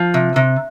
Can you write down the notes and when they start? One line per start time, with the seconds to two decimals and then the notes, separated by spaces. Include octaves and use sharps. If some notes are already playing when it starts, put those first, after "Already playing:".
Already playing: F3
0.14 C3
0.36 C3